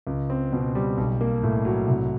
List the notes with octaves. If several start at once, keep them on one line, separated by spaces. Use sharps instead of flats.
C#2
C4
B2
G3
B1
A#3
A2
F#3
C2